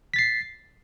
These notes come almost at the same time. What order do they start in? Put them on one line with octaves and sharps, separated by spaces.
B6 A6 C7